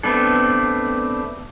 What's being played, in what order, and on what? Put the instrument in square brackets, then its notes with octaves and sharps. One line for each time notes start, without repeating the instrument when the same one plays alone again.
[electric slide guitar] A3 B3 C4 D4 A4